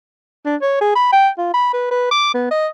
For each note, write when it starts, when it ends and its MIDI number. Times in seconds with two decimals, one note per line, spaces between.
0.45 0.56 62
0.62 0.80 73
0.81 0.94 68
0.96 1.07 83
1.13 1.29 79
1.38 1.49 65
1.54 1.71 83
1.73 1.87 71
1.91 2.07 71
2.11 2.32 86
2.34 2.50 59
2.51 2.68 75